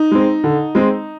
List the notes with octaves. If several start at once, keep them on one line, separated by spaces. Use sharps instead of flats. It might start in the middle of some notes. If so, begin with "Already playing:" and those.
Already playing: D#4
G#3 C4
D3
G#3 C4